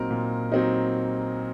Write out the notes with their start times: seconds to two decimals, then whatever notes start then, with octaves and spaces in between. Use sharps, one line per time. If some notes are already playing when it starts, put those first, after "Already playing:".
Already playing: A#2 F#3 C4 D#4 A#4
0.11 A#2
0.52 F#3 C4 D#4